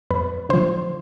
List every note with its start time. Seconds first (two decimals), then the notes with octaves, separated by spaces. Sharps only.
0.11 F2 B4
0.49 D3 F3 C5